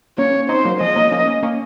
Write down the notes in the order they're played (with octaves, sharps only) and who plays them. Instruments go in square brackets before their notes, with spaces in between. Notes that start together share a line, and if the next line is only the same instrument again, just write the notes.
[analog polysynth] A#3 C#4 [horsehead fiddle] C#5
[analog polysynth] C4 D#4 [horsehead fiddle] C5
[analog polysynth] F#3 A#3
[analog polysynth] F3 G#3 [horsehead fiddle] D#5
[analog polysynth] F#3 A#3
A#3 C#4
A#3 C#4
A#3 C#4